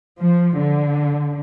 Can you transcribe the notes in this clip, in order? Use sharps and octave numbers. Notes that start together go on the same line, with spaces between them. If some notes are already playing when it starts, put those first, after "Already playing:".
F3
D3